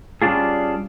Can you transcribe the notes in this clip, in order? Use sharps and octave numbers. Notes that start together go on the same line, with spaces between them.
G3 C#4 D4 F4 G#4